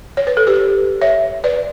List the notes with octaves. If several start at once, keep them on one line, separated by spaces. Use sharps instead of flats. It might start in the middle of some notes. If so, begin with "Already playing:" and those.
C#5
B4
A4
G4 B4
C#5 E5
B4 D5